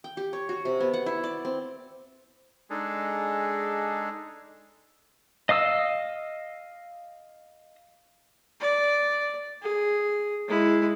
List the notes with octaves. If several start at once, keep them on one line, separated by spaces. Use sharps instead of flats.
G5
G4
C#5
F#4
C3
B3
F#5
E4
D5
C4
G#3 D4 D#4 G#4 A4
D#5 F5 D#6 E6
D5
G#4
G#3 E4